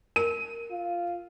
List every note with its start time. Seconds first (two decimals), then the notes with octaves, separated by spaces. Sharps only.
0.16 A#4 D#7
0.72 F4